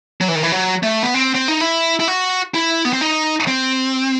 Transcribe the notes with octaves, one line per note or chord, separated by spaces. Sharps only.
F#3
E3
D#3
E3
F#3
A3
B3
C4
C4
D#4
E4
E4
F#4
E4
B3
C4
D#4
C4